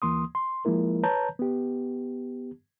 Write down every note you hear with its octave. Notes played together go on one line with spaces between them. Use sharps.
D2 E3 A#3 C6 D#6
C6
F3 G#3 A#3 E4 A#4
B4 C#5 A5 A#5 G6
B3 G4